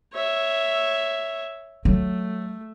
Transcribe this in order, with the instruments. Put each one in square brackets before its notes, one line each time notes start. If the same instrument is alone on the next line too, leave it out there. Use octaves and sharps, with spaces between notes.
[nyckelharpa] C#5 E5
[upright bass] F#3 [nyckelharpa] A3